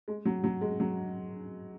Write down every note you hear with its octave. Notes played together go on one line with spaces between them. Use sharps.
G#3
F#3
F#3
G#3
F#3